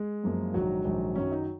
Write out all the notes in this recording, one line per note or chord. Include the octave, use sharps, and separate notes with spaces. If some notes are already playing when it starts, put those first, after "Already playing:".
Already playing: G#3 G#4
F#2 F3 A#3
A#1 G#2 D#3 F#3 F#4
A#1 G#2 D#3
F#2 D#3 F#3 C#4
D#4